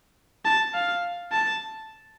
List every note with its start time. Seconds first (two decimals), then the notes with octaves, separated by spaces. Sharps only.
0.45 A5
0.74 F5
1.32 A5